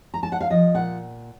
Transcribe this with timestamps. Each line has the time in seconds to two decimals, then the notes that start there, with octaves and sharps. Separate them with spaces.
0.14 A#5
0.23 A5
0.32 F#5
0.41 F5
0.50 F3 D#5
0.74 A#2 F#5